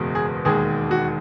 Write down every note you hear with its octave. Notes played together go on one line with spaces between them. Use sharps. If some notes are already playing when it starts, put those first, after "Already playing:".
Already playing: F#1 E2 B2 G#3
G#4
E1 D#2 D#3 G#3 G#4
F#4